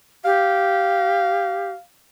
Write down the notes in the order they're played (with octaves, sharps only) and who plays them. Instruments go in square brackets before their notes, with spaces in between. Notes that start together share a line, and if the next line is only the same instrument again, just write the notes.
[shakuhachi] G4 [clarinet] F5